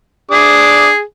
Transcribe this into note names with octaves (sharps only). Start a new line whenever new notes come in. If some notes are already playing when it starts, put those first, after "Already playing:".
D4 G#4 D6 D#6